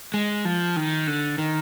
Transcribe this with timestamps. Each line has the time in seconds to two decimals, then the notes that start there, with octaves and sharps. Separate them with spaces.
0.14 G#3
0.45 F3
0.76 D#3
1.07 D3
1.38 D#3